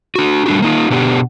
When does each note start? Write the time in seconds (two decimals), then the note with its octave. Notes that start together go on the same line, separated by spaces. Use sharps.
0.15 D4 F#4
0.46 G3 A3 D4 F#4 G4
0.62 A#3 D#4 F4
0.90 B2 B3 D4 G4